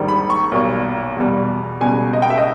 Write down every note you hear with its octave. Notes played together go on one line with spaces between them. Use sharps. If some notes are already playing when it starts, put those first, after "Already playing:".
Already playing: A#1 G#2 D#3 G3
B5
C#6
B1 A#2 G3
E2 B2 G3
C#2 B2 G3 G#5
D#5
G5
E5
D#5